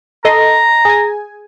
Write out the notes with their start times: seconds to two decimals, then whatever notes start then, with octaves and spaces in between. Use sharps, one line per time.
0.25 A4 D#5 A#5 C6
0.85 G#4 G#5